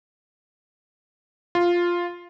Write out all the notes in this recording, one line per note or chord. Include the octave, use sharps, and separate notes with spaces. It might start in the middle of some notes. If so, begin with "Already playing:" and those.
F4